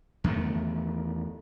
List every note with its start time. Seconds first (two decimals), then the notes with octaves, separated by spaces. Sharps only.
0.24 E2 D#3 A3